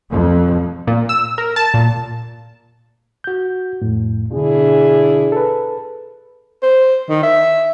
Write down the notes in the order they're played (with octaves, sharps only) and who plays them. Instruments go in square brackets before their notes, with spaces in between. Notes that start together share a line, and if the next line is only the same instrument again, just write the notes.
[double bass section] F2
[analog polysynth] A#2
E6
A#4
A5
A#2
[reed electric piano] F#4 G6
F2 A2
[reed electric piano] B2 D3 [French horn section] D4 E4 G#4
[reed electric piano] A4 B4
[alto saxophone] C5
D#3
E5